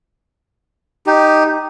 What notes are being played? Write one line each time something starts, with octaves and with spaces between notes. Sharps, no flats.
D#4 G4